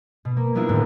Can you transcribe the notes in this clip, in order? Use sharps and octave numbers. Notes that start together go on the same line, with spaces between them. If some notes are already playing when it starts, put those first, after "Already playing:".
B2
A#3
G3 A#3 B3 D4 E4 F4
D#1 A2 D3